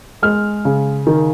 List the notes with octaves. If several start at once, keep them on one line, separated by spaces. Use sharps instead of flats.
G#3 F6
C#3
D#3